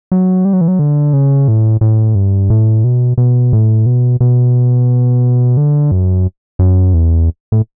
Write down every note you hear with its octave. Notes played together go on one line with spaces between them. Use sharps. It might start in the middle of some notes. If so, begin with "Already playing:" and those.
F#3
G3
F#3
E3
F#3
D3
C#3
A2
A2
G2
A2
B2
B2
A2
B2
B2
D3
F#2
F#2
E2
A2